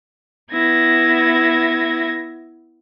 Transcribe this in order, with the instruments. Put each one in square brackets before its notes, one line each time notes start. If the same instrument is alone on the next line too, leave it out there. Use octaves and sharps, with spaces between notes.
[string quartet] B3 E4 G#6 A#6